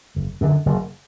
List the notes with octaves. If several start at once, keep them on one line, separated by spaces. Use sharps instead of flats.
F#1
F#2 D3
F#1